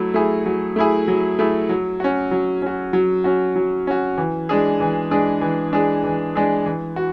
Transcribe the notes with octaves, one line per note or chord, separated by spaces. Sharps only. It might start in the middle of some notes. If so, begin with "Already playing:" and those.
Already playing: F#3 A3 E4
A3 E4 G#4
F#3
A3 E4 G#4
F#3
A3 E4 G#4
F#3
C#4 F#4
F#3
C#4 F#4
F#3
C#4 F#4
F#3
C#4 F#4
E3
G#3 D4 G#4
E3
G#3 D4 G#4
E3
G#3 D4 G#4
E3
G#3 D4 G#4
E3
F#4